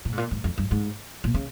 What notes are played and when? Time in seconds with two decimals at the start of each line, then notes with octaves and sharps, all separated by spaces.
0.05 A#2
0.12 G#2
0.18 A#2
0.31 G#2
0.44 F2
0.58 G2
0.71 G#2
1.24 A#2
1.34 C#3